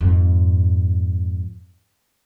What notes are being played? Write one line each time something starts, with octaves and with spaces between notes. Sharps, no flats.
F2 G#2